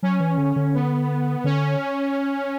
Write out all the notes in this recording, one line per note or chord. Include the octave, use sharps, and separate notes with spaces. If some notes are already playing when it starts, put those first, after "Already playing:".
F#3 C#4
E3
D3
D3
B3
D3 C#4